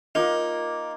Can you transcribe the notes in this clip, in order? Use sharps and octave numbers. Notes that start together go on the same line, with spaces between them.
A#3 D#4 F4 D6